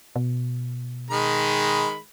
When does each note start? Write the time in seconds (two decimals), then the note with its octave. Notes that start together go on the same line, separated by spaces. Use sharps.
0.16 B2
1.10 D#3 G#3 B5